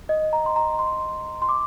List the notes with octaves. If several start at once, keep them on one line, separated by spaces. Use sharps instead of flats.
D#5
A#5
C6
A#5
C6
C6
D6